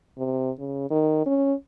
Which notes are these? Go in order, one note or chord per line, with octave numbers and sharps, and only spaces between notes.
C3
C#3
D#3
C#4